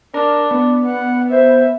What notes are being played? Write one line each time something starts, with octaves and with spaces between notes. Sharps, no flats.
D4 A#4
B3
F#5
C5 E5